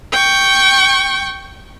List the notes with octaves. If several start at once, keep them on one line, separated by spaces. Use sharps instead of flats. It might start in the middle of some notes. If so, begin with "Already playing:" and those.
G5 C#6